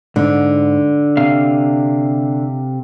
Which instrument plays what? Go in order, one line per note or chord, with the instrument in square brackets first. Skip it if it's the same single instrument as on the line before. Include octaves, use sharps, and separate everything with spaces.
[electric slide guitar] G#2 [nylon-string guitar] D3
[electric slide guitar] C3 F5